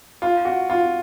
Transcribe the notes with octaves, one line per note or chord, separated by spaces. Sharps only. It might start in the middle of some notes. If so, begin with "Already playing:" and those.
F4
F#4
F4